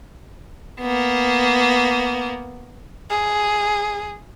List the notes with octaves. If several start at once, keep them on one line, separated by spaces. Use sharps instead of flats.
A#3 B3
G#4